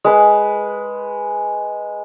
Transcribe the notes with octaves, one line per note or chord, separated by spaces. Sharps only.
G#3 B4